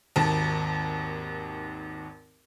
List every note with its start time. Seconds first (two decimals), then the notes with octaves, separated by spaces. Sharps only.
0.16 G#1 D#2 A5